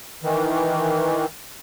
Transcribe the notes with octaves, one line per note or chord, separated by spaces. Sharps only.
D#3 E3